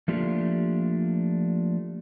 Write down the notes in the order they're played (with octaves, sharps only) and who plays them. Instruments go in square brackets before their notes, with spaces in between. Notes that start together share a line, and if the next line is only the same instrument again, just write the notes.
[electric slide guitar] F3 A3 A#3 D4 F4 G4